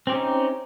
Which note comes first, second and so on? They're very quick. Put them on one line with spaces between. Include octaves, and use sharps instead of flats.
C4 G4 C#4 D#4